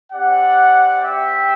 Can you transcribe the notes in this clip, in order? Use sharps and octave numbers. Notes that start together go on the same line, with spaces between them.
C4 G4 D5 F#5
E5 G5